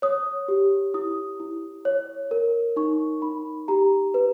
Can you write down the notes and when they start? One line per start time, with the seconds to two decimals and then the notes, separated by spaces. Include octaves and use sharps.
0.02 C#5 D#6
0.48 G4
0.94 E4 D#6
1.40 E4
1.85 C#5
2.31 A#4
2.76 D#4 C#6
3.22 D#4 B5
3.68 G4 A#5
4.14 B4